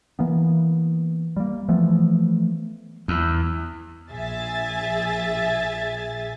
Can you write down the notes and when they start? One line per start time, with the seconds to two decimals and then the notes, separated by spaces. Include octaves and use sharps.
0.19 E3 A#3 B3
1.36 G3 A#3
1.68 E3 F3 A3 B3
3.08 E2
4.11 A#1 G#4 E5 G#5 A6